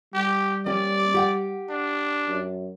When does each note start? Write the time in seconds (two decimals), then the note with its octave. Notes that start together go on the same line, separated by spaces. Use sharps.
0.14 G3 G4
0.66 A#3 C#4 G4 D5
1.14 G4 F#5 G5
1.70 D4
2.27 F#2